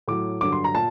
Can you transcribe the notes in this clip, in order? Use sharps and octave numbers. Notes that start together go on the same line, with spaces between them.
A2 F#3 D6
G2 D3 F#3 D6
C6
A#5
A#2 A5